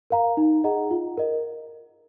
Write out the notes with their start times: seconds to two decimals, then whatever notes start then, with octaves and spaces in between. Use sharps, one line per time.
0.10 A#4 F5 A#5
0.37 D#4
0.64 G#4 D#5 F#5 A#5
0.91 F4
1.18 A#4 D#5